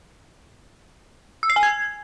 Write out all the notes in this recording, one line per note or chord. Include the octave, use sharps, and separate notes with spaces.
E6
C7
G#5
G#6